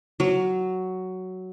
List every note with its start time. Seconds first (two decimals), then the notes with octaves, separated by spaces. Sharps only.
0.20 F#3